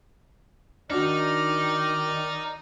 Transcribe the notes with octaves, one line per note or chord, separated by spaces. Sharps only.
D#3 D4 D#4 F#4 D5 F6